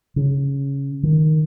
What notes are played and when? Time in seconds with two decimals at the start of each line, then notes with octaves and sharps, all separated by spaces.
0.16 C#3
1.03 D#3